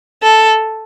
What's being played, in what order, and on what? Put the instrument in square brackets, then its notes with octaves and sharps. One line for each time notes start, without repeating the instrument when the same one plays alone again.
[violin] A4